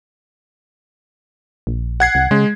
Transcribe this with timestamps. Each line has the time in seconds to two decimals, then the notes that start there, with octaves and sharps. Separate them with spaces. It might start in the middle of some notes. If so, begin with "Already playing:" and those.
1.67 A#1
2.00 F#5 G#6 C7
2.15 C2
2.31 C#3 G#3